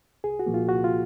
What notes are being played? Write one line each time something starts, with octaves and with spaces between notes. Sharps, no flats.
C2 G#4
F#4
A#2 F3 A#3
F4
C2 F#4
F4